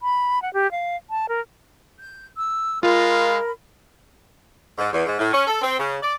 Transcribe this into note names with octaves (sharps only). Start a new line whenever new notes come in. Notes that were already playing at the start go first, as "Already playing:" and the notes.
B5
F#5
G4
F5
A5
A#4
G6
E6
G#3 F4 A#4 F5 B5
G#2
E2
G#2
A2
C#4
A4
C4
C#3
D5